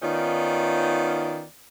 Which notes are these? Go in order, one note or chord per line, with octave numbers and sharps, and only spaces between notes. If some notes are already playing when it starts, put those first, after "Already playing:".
D#3 B3 C#4 D#4 F4 D5